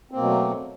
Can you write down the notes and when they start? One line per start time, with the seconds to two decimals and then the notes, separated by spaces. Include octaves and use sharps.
0.11 C4
0.14 A#3
0.17 B2
0.20 F#3
0.23 A3